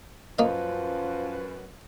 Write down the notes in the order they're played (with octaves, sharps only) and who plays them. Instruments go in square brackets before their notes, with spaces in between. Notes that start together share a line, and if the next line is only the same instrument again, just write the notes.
[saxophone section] F#2 B4 [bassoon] F3 [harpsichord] A#3 D#5